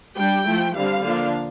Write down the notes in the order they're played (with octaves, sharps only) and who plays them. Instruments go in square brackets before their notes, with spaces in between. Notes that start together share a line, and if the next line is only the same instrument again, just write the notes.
[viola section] G3 D4 G5
F3 A3 E4
D3 G3 C4 F5
D3 F3 A#3 D4